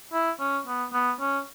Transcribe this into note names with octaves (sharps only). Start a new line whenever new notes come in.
E4
C#4
B3
B3
C#4